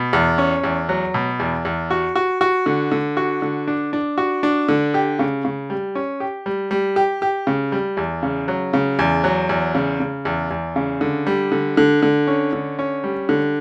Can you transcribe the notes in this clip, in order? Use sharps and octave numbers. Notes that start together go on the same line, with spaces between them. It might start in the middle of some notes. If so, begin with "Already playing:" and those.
Already playing: B2
E2
C#4
E2
F#3
B2
E2
E2
F#4
F#4
F#4
D3
D3
F#4
D3
D4
D4
F#4
D4
D3
G4
C#3
C#3
G3
C#4
G4
G3
G3
G4
G4
C#3
G3
E2
C#3
F#3
C#3
E2
F#3
E2
C#3
C#3
E2
E2
C#3
D3
G3
D3
D3
D3
C#4
D3
C#4
G3
D3